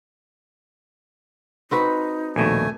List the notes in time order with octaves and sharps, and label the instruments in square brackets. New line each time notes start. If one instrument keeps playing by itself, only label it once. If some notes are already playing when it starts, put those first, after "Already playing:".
[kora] C4 F#4 B4 [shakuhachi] D#4
[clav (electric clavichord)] A#1 D#2 B2 [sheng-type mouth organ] A3 G#5